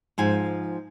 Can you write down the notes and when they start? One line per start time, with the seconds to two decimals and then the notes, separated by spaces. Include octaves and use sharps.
0.18 G#2 F3 G#5